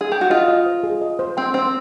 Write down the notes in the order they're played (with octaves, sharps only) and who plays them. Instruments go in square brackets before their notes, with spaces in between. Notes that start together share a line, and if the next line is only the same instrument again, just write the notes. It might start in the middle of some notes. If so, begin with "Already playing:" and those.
[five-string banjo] G#4
G4
F#4
[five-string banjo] F4 [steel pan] D#5
[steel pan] D#5
C5
G#4
D#5
C5
[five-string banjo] C4 [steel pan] G5
[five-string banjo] C4 [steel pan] C5